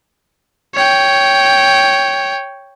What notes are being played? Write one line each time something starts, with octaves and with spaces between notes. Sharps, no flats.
C#5 G5